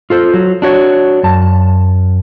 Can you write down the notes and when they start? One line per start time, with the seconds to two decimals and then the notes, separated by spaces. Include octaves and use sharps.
0.10 F4 A4 C5
0.34 F#3
0.62 D4 F#4 C#5
1.23 F#2 A5